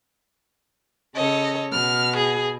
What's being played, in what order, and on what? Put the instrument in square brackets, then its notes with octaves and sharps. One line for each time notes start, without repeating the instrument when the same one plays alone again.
[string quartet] C#3 A4 C#5 [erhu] D#5
[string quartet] B2 [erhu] F6
[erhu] G#4